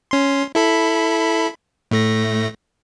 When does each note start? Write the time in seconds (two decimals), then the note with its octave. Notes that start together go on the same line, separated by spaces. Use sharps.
0.11 C#4 C6
0.55 E4 A4 B5
1.91 A2 A3 A#6